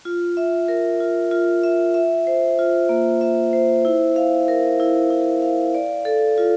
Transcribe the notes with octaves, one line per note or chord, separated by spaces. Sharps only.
F4
E5
A#4
F4
F4
E5
E5
C5
F4
A#3
E5
C5
E4
F5
A#4
E4
E4
F5
D5
A4
F4